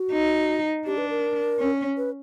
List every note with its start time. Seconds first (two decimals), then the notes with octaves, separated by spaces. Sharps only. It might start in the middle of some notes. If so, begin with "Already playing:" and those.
Already playing: F#4
0.12 D#4
0.86 D4 G4
0.98 B4
1.10 A#4
1.60 C#4
1.97 B4